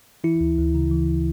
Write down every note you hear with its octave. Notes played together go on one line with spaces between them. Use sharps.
E3 E4
D2
D2
C#3
E3